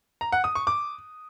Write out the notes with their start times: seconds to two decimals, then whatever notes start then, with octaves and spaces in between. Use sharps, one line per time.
0.21 A#5
0.32 F#5
0.44 D#6
0.55 C#6
0.67 D6